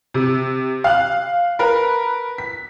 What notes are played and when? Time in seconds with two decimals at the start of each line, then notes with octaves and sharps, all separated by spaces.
0.14 C3
0.84 F5 F#6
1.59 A#4 B4
2.38 B6